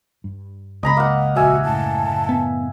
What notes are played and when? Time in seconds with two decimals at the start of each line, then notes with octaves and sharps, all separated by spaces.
0.24 G2
0.83 C#2 D#5 A#5 B5
0.97 A#3 F#5
1.36 A#1 D#2 F#4 E5 G#5
1.64 F#1 A2 A5
2.29 B3